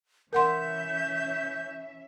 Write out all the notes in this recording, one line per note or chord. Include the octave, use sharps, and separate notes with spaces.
E3 C#4 A#4 E5 F#5 C6 G6